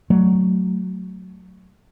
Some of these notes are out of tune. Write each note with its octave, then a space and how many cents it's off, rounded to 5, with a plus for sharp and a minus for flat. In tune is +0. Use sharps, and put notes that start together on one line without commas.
F#3 +0 A3 +0